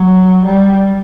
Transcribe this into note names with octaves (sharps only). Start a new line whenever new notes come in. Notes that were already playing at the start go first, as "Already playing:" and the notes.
Already playing: F#3
G3